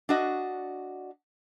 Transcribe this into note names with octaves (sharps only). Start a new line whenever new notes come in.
D4 F#4 D#5